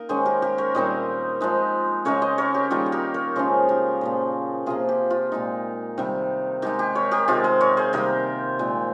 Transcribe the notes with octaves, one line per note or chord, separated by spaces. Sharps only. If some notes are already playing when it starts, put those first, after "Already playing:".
Already playing: A#3 D#4 A#4 D#5
D#3 G#3 C#4 G#4 C5
G4 A#4
G4 A#4
A#4 C#5
A#2 G3 C4 D#4 C5 D#5
F3 G#3 D#4
C#3 G#3 D#4 A#4 C#5
C5 D#5
A#4 C#5
G4
D#3 G3 A#3 D#4 F4 G#4
G#4
G4 A#4
A#4 C#5
C#3 F3 G#3 C#4 G#4 C5
G4 A#4
A#2 F3 A#3
C3 F3 A#3 F4 G#4
G4
F4
A#2 G#3 D#4
C3 D#3 G3
D#3 G#3 D#4 G4
G4
A#4 C#5
G4 A#4
C3 D#3 G#3 F4 G#4
G#4 C5
A#4 C#5
G#4 C5
C3 D#3 G3 A#3 G4 A#4
A#2 G#3 C4